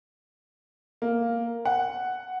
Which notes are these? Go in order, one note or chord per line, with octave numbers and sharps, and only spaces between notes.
A#3
F#5